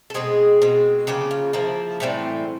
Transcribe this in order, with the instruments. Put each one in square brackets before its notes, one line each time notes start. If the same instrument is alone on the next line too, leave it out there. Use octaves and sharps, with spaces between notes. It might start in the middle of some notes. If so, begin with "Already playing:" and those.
[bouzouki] A4
B2 G#3 C4 G#4
B2 G#3 C4
C#3 F3 A#3 G4
F4
C#3 F3 A#3 E4
A2 E3 G3 C4